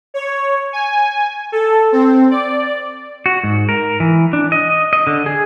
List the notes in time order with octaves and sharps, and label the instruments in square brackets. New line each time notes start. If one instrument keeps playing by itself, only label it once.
[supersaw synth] C#5
G#5
A4
C4
D5
[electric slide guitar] F#4
G#2
A#4
E3
D4
D#5
D#5
D3
G#4